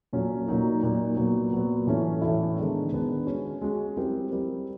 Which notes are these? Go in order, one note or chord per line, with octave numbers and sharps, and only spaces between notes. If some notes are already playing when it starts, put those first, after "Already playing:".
A#2 F#3 A3 C#4 F4
A#2 F#3 A#3 D#4
A#2 F#3 A#3 D#4
A#2 F#3 B3
A#2 F#3 B3
A2 E3 A3 C#4 E4
A2 E3 A3 C#4 E4
D#3 G#3 B3 D4
D#3 G#3 B3 D4
G#3 C#4 F#4
G#3 C#4 F#4
G3 C4 E4 G4 A#4
G3 C4 E4 G4 A#4